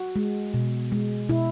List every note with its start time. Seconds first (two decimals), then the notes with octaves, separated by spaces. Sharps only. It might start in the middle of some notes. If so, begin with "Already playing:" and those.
Already playing: F#4
0.16 G#3
0.54 B2
0.92 G#3
1.29 B2 E4